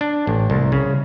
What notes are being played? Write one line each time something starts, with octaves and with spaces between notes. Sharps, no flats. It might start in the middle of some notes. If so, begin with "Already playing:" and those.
D4
A1
C2
C#3